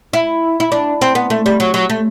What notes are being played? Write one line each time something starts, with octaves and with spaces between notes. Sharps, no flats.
E4
E4
D4
C4
B3
A3
G3
F#3
F#3
A3